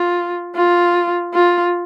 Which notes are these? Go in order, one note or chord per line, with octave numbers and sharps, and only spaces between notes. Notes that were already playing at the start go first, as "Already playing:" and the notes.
Already playing: F4
F4
F4